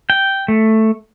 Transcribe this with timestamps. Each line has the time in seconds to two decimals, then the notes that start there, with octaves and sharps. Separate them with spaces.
0.10 G5
0.48 A3